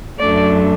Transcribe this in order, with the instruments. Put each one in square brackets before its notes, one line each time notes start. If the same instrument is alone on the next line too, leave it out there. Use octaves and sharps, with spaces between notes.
[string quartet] F#2 F#3 A3 D4 D5